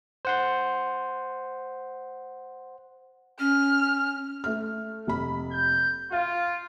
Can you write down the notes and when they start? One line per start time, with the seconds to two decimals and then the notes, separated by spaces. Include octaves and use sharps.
0.25 C5 F#5 C6
3.39 C#4 F6
4.44 A3 F6
5.07 F1 B5
5.52 G6
6.12 F4 F5